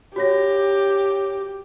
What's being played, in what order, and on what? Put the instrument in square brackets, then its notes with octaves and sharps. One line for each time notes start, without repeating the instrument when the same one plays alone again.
[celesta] F#4 C#5 A#6 [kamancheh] G4